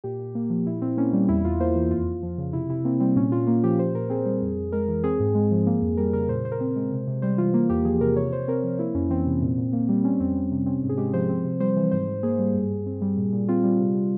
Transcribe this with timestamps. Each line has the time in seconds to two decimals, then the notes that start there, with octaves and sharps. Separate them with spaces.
0.04 A#2 G4
0.19 A#2
0.35 A#3
0.50 F3
0.66 A#2 E4
0.81 A#2 C4
0.97 A#3 C#4
1.13 G3
1.29 E2 E4
1.45 E2 F4
1.60 A#3 C5
1.75 E3
1.91 F2 F4
2.07 F2
2.23 F3
2.38 C#3
2.53 C3 E4
2.69 C3 E4
2.85 A#3 C4
3.00 G3 C4
3.16 A#2 C#4
3.32 A#2 F4
3.47 A#3 F4
3.64 F3 G4
3.79 A#2 C5
3.94 A#2 A#4
4.10 C4 G#4
4.26 G3
4.41 F2
4.57 F2
4.72 G#3 A#4
4.88 E3
5.04 C4 G#4
5.20 G#2
5.35 G#3
5.51 F3
5.67 A#3
5.82 F2
5.97 G3 A#4
6.13 C#3 A#4
6.29 A#2 C5
6.44 A#2 C5
6.52 A#4
6.60 C4 C5
6.76 G#3
6.92 C3
7.07 C3
7.22 G3 C5
7.38 E3 F4
7.54 A#3 F4
7.70 E2 G4
7.85 F3 G#4
8.01 C3 A#4
8.16 C3 C#5
8.32 C3 C5
8.48 C4 A#4
8.63 F3
8.79 A#3 E4
8.94 F2 C#4
9.10 E3 C4
9.26 C3
9.42 A#2
9.58 A#2
9.73 A#3
9.89 G3
10.04 C4 C#4
10.20 F2 C4
10.36 G3
10.52 C3
10.66 C4 C#4
10.83 G#2
10.89 G#4
10.97 G#3 G4
11.13 F3 C5
11.29 C4
11.45 C3
11.60 G3 C5
11.77 E3
11.92 G#2 C5
12.07 G#2
12.23 A#3 G#4
12.39 G3
12.54 G2
12.70 G2
12.86 C4
13.01 G3
13.17 A#2
13.33 A#2
13.48 C4 F4
13.64 G3
13.79 C3
13.95 C3